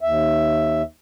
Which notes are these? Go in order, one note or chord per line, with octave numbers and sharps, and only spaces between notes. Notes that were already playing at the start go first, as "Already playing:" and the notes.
D#2 E5